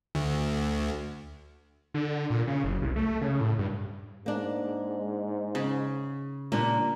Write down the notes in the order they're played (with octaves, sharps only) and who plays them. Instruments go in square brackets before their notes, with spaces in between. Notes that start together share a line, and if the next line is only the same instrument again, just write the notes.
[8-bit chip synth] D2
[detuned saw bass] D3
A#2
C#3
F#1
C2
A3
C#3
A2
G2
[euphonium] G#2 [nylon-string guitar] A#3 D4
[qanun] C#3
[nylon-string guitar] A#2 G3 D4 [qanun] A#3